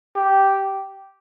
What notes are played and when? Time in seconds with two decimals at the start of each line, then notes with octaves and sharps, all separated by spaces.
0.16 G4